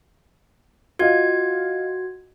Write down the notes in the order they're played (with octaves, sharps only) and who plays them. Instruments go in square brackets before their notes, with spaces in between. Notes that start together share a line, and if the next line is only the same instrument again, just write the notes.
[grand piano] F4 D#5 F5 [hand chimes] F#4 G#6